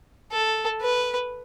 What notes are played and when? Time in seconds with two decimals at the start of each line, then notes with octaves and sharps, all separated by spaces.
0.32 A4
0.81 B4